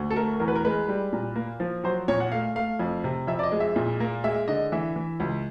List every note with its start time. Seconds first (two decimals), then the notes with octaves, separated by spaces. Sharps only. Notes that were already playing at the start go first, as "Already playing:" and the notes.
Already playing: D2
0.10 A4
0.16 A3 A#4
0.40 E2 A#4
0.48 B4
0.55 A#4
0.65 G#3 B4
0.89 G3
1.13 A#2
1.36 A#3
1.60 F3
1.84 F#3 C5
2.08 A#2 C#5
2.20 F#5
2.32 A3 F5
2.56 A3 F5
2.79 F2
3.04 C3
3.27 F2 E5
3.39 D5
3.43 D#5
3.52 G#3
3.60 E5
3.76 A#2
4.00 A#3
4.24 G#3 E5
4.48 D3 D#5
4.72 E3 E5
4.96 E3
5.20 C#2